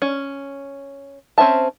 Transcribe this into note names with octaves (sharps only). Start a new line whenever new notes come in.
C#4
C4 C#4 C5 E5 A5